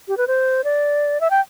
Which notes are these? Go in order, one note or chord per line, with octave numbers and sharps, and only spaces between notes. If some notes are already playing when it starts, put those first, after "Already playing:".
G4
B4
C5
D5
E5
G5